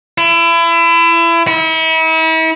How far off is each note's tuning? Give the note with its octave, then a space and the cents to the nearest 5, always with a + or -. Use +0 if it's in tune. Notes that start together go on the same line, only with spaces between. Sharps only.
E4 +30
E4 -40